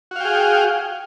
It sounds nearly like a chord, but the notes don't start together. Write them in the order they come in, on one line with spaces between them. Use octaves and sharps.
F#4 F5 G5 G#4